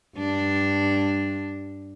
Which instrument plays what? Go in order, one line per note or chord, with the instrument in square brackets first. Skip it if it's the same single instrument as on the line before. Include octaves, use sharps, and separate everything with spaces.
[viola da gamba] G2 D4